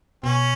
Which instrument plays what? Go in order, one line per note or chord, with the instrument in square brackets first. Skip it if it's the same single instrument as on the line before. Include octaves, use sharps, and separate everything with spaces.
[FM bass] B2 [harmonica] C#4